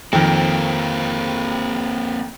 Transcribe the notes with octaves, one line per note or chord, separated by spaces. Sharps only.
F2 D#3 A#3 C4